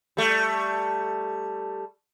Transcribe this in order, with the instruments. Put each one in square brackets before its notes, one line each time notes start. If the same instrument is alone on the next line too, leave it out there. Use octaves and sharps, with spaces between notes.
[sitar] G3 A3